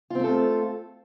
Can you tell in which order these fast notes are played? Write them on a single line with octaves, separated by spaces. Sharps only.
F4 C4 A3 A4